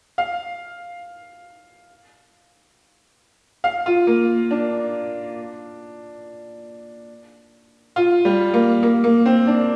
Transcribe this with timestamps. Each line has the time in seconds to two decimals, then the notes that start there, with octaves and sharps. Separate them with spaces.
0.18 F5
3.64 F5
3.86 F4
4.07 A#3
4.51 D4
7.96 F4
8.25 G3
8.54 A#3
8.83 A#3
9.04 A#3
9.26 C4
9.47 D4